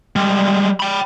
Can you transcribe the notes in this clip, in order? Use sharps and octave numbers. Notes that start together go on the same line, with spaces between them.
G3 G#3
G5 B5